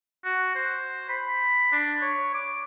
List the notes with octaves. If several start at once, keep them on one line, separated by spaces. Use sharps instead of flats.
F#4
C5
B5
D4
C#5
D6